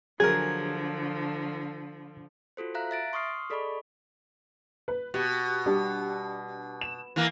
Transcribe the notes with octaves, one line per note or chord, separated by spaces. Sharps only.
D3 F3 F#3 G#4 A#4 G#6
F4 F#4 A4 C5
E5 F5 A#5 F#6
E5 A6 D7
C6 C#6 D#6 F6 C7
G#4 A4 D5 D#5 B5 C#6
B4
B2 G4
G3 D4 G4
E7
E3 A#3